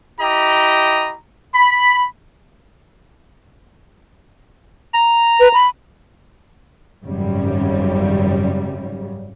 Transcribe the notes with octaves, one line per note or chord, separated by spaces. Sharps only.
E4 G4 D#5 A#5
B5
A#5
B4
B5
G#1 F#2 C#3 G3